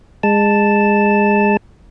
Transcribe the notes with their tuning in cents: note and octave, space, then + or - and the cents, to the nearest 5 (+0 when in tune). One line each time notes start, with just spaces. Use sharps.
G#3 -20 A5 +0